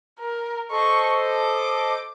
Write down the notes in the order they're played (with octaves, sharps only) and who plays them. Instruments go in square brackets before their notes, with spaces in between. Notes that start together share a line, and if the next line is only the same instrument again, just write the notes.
[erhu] A#4
[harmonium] A4 C5 D#5 [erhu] C#6
[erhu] D6